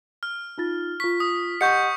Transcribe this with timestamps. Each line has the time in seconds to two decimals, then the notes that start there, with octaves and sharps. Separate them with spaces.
0.23 F6
0.58 D#4 F4 A6
1.00 F4 C#6 B6
1.20 D#6
1.61 G4 D#5 F#5 C#6 G6 C#7